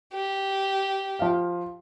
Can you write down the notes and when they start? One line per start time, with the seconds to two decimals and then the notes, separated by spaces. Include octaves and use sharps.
0.13 G4
1.19 F3 F5